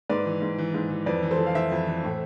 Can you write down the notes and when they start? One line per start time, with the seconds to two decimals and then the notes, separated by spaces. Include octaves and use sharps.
0.09 G#2 B4 D5
0.26 E3
0.42 G#2
0.58 E3
0.74 G#2
0.90 E3
1.06 F2 B4 D5
1.23 E3
1.31 A4 C5
1.38 F2
1.46 F5
1.55 E3 C5 E5
1.72 F2
1.87 E3
2.03 A2